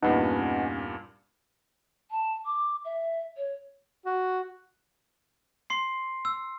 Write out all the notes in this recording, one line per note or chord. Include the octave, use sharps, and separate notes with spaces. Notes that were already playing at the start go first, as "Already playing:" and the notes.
E2 G2 A#2 C#4 D#4 B4 D#5 F#5
A5
D6
E5
C#5
F#4
C6 C7
E6